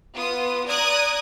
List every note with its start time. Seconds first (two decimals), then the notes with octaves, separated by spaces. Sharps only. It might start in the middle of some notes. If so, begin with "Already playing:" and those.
0.15 B3 F4 D#6
0.67 D5 A#5 D#6 F#6 G#6